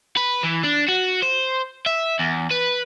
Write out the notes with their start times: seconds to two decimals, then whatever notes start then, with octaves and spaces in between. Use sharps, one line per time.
0.17 B4
0.43 E3
0.64 D4
0.88 F#4
1.22 C5
1.86 E5
2.19 E2
2.51 B4